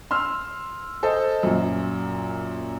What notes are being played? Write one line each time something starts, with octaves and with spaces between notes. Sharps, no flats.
C6 E6 F6
A4 C5 D#5
F#2 A#2